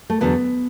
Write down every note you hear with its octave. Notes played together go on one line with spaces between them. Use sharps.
A3
E2 D3 F#3 B3